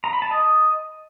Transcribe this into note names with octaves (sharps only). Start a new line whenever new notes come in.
A#5
B5
A5
D#5